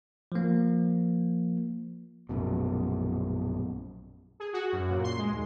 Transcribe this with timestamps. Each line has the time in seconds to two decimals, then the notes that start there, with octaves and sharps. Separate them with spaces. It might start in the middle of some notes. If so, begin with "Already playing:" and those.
0.32 F3 A#3
2.29 A#1 F#2 B2
4.40 G#4
4.53 F#4
4.73 F#2
4.90 A#2
5.04 C6
5.18 G#3
5.31 D#2